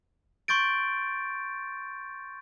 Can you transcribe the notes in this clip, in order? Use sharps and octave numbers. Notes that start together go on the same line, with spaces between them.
C6 C#6 G6 A6 D7